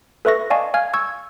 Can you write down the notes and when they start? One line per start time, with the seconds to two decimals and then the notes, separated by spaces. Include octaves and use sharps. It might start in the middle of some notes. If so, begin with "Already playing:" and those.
0.25 A4 B4 E5 C#6 A#6
0.50 D5 D#5 F5 G#5 A5 C#6
0.74 F5 G#5 F6 G#6
0.94 C#6 E6 G#6